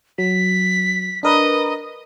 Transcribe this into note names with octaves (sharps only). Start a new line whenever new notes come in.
F#3 B6
D4 A#4 B4 D#5